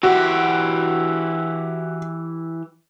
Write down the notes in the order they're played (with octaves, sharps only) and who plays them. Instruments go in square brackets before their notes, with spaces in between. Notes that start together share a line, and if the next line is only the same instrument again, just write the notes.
[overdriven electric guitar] E3 G4 [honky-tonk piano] F#4